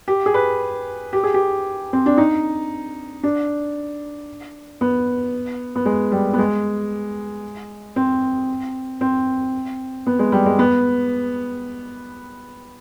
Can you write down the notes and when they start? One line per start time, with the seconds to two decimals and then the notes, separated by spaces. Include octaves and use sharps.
0.08 G4
0.26 G#4
0.34 B4
1.13 G4
1.24 G#4
1.34 G4
1.93 C4
2.06 D4
2.18 D#4
3.23 D4
4.81 B3
5.75 B3
5.86 G#3
6.12 G3
6.33 B3
6.39 G#3
7.96 C4
9.01 C4
10.07 B3
10.19 G#3
10.32 G3
10.46 G#3
10.59 B3